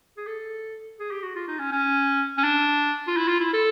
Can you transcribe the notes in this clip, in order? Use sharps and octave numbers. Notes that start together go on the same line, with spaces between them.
G#4
A4
G#4
G4
F#4
F4
D#4
C#4
C#4
C#4
D4
F4
E4
F4
E4
A4